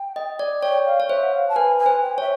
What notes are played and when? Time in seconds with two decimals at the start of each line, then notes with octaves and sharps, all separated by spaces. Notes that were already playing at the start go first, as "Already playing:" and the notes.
Already playing: G5
0.16 D#5
0.39 D5
0.62 C#5 G5
0.86 F5
1.00 C#5
1.09 C5 E5
1.23 F#5
1.33 F5
1.49 A5
1.55 B4 G#5
1.79 G#5
1.86 C5
2.02 G5
2.18 C#5 E5